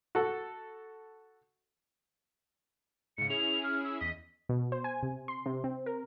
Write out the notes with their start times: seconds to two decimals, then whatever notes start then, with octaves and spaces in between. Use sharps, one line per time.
0.15 F#4 A4
3.18 G#2 C#3 C#7
3.30 C#4 E4 G#4 F7
3.63 F6
3.84 E6
4.00 E2 D#5 B6
4.49 B2
4.72 C5
4.84 G#5
5.03 C3
5.28 C6
5.46 C3
5.64 C4
5.86 A#4